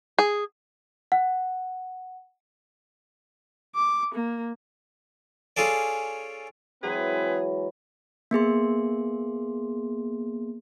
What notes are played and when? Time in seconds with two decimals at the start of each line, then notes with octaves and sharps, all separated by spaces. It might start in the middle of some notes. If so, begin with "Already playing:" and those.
0.19 G#4
1.12 F#5
3.75 D6
4.15 A#3
5.57 C#4 F4 G#4 A4 D5
6.83 E3 F#3 G#3 C4 G#4 B4
8.31 A#3 B3 G#4 C6